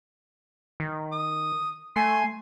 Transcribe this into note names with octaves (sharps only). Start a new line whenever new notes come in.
D#3
D#6
A3 G#5 C6